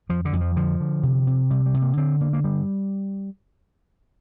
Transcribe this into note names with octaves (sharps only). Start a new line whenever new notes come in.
F2 F3
D3
F2
F3
D3 F3
D3
C3
C3
C3 G3
G3
C3
A#3
D3 C4
D3 A#3
A#3
G2 G3